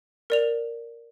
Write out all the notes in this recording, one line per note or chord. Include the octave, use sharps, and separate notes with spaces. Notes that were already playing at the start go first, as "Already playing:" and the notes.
A#4 D5 F7